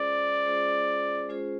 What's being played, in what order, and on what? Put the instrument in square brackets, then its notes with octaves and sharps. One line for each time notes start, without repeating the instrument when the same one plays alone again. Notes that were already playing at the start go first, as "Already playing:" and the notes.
Already playing: [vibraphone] G#3 C#4 F4 G#4 C5 [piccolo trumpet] D5
[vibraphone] G#3 C#4 F4 G#4 C5
G#3 C#4 F4 G#4 C5